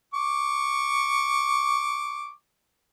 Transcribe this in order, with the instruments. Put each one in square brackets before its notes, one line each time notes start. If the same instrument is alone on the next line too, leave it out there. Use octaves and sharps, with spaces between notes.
[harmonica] C#6 D6